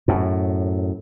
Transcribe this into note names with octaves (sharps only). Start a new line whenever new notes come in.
F#2 A2